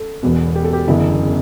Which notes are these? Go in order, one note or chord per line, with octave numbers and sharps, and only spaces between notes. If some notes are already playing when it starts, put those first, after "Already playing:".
Already playing: A4
E1 E2 B2
G4
A4
G4
F#1 E2 D3 E4